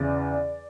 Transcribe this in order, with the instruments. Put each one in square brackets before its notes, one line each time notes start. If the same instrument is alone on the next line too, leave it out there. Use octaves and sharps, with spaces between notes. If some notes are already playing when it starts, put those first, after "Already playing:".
Already playing: [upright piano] E2 C#3 E3 D5